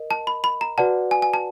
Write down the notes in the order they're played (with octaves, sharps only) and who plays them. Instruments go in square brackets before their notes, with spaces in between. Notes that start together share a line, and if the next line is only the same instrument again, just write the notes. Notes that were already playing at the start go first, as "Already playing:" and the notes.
Already playing: [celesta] A#4 D#5
[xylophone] A5
B5
B5
A#5
[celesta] F#4 B4 D5 F#5 [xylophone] A5
[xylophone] G#5
G#5
A5